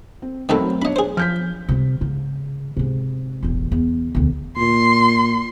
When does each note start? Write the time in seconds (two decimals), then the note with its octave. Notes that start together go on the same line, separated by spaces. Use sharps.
0.22 C4
0.49 D#3 F#3 A3 C4 D#4 A4 A#4 B5
0.82 D4 C#5 D#5 B5
0.96 G#4 C5
1.17 F3 F6 G6 B6
1.69 C3 G3
2.01 G#2 C#3
2.77 G#2 C3
3.43 E1 A1
3.72 E2
4.15 E1 D2
4.57 A#2 C6